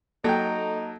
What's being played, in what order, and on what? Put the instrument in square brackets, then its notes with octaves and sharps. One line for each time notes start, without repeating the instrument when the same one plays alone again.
[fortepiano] F#3 G5 [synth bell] A#3 A4 A5 [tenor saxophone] D#4